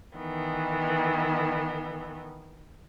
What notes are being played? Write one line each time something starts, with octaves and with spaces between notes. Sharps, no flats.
D#3 E3 B3